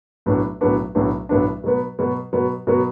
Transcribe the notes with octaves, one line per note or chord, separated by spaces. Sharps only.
B1 A2 F#3 B3 D4
B1 A2 F#3 B3 D4
B1 A2 F#3 B3 D4
B1 A2 F#3 B3 D4
B2 F#3 B3
B2 F#3 B3
B2 F#3 B3
B2 F#3 B3